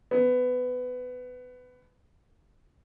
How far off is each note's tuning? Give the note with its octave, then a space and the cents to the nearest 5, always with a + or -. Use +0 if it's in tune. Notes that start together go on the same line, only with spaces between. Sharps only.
B3 +20